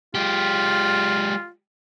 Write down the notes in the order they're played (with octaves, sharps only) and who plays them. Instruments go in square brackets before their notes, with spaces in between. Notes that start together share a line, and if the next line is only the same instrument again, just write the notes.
[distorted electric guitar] G#3 G4 [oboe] F4